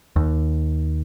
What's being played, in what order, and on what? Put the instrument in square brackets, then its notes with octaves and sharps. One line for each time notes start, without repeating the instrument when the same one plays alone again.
[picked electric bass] D#2